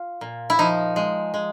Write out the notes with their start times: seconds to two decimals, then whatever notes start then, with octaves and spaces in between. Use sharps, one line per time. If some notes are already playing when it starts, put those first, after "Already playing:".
Already playing: F4
0.21 A#2
0.50 E4
0.59 F3 D#4
0.96 G#3
1.34 G#3